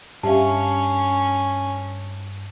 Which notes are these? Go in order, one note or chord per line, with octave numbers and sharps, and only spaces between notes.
G2 C#4 G4 E5 F5 A5